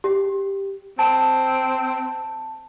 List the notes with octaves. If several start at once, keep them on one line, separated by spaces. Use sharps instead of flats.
G4
C4 A5